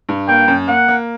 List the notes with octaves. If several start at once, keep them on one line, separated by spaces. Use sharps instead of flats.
G2
A#3 G5
F#2
A#3 F#5
A#3